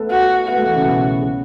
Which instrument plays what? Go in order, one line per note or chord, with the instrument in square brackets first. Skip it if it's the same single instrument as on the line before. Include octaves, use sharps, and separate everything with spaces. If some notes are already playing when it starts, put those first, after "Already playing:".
Already playing: [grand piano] A3 B3 A4 B4
[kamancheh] F#4
[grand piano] B3 B4 [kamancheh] F#4
[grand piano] A3 A4
E3 E4
C#3 C#4
B2 B3
C#3 C#4